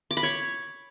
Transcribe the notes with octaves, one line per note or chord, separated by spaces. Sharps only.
D6
B5
C#5